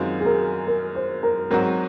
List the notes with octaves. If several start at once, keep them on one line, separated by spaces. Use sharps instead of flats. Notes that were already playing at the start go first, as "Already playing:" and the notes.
Already playing: F#2 D#3 G#3 C4 F4 F#4
G#4
A#4
A#4
C5
A#4
G#2 F#3 C4 F#4 A#4